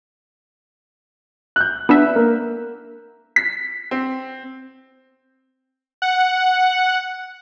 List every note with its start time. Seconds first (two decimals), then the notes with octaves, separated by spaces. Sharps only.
1.56 F#6 G6
1.89 B3 D4 E5
2.15 A#3 A#4
3.36 B6
3.91 C4
6.02 F#5